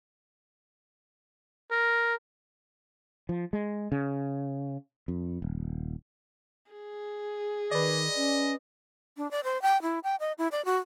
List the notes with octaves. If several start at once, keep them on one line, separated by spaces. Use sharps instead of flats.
A#4
F3
G#3
C#3
F2
D#1
G#4
D#3 B4 D5 D#5
C#4
D4
D5
C5
G5
E4
G5
D#5
E4
D5
F#4